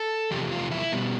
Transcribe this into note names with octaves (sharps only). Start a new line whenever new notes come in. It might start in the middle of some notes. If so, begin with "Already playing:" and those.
Already playing: A4
E2 C3 F3 G4
F4
E4
B2 G3